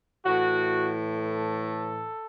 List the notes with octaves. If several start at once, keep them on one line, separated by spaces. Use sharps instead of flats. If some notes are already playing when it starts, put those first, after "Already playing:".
A2 E3 F#4
A4